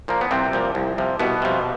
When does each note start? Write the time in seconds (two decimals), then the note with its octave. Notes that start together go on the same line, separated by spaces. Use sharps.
0.08 A#2 F3 A#3
0.21 B3
0.31 C2 C3 C4
0.53 A#2 F3
0.75 C2
0.98 C3 F3
1.19 C2 B2 B3
1.42 C3 F3